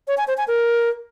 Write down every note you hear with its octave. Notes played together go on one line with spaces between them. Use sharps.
C#5
G#5
C5
G#5
A#4